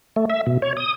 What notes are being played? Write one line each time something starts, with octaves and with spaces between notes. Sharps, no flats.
A3
E5
B2
C#5
D#6